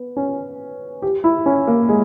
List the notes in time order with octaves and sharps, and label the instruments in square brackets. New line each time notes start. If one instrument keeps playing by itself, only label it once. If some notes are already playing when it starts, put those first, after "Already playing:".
Already playing: [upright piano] B3
C#4
G4
E4
C#4
A#3
G#3